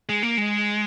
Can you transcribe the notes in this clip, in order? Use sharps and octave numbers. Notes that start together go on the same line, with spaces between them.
G#3
A#3
G#3